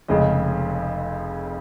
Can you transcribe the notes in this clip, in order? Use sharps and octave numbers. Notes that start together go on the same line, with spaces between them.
F1 F2 C#3 G#3 D#5